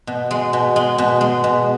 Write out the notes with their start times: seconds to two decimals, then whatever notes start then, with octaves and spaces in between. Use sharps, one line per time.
0.07 B2
0.31 G#3
0.53 B2
0.76 G#3
0.98 B2
1.21 G#3
1.44 B2